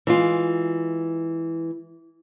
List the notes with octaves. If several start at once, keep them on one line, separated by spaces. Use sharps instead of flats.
E3 G#3 F4